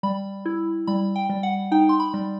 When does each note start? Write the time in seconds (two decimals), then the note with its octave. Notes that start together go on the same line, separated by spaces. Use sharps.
0.03 G3 B5
0.46 E4
0.87 G3 B5
1.16 G5
1.29 G3
1.43 F#5
1.72 D#4 G5
1.89 C6
2.00 B5
2.14 G3